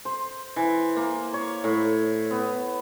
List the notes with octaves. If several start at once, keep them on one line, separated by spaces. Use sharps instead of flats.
C5
E3
A#3
C#5
A2
B3